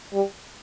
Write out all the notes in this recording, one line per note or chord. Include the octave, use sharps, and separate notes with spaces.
G3